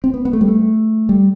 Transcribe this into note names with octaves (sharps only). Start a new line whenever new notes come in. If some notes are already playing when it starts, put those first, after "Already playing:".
C4
B3
B3
A3
G3
A3
G3